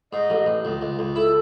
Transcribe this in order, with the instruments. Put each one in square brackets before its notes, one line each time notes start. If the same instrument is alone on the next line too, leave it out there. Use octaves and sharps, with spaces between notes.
[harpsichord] G#2 [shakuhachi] D#5
[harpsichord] A1
A1
C#2
C#2
C#2
[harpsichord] E4 [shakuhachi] A4